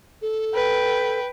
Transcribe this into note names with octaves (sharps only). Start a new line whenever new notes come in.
A4
B4 G5